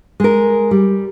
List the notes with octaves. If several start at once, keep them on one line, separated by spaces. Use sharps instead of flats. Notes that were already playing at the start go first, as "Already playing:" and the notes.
G#3 A#4
G3